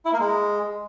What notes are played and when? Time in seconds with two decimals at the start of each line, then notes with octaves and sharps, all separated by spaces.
0.05 E4
0.13 A#3
0.20 G#3